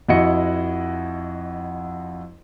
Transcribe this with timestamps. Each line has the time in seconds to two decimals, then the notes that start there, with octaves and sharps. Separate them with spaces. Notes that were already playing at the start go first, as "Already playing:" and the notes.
0.09 F2 E4 F#4 D#5 C#7